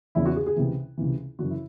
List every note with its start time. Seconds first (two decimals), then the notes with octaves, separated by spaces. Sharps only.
0.15 E2 C#3 E3 E4
0.26 F#4
0.36 G#4
0.47 G#4
0.56 C#2 C3 E3
0.97 C#2 C3 E3
1.39 F#2 C#3 E3 F#4
1.50 E4